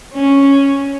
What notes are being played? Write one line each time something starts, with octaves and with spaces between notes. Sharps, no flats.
C#4